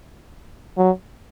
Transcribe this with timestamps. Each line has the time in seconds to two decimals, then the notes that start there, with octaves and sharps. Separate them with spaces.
0.78 F#3